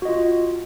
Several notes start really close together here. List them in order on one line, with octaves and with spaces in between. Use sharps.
F#4 D#5 F4